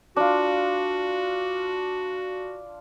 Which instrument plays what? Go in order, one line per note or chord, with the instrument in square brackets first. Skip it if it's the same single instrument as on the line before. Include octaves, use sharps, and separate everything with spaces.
[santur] D4 F4 [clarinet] F#4